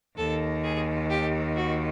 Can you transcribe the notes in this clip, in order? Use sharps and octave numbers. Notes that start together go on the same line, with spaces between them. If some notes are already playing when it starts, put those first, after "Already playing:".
D#2 D#3 A4
G#4
G4
F#4